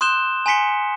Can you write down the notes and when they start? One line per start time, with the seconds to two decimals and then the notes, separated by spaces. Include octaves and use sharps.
0.01 C6 D#6 F#6 G6 E7 G7
0.46 G#5 A#5 C6 B6 C#7 G7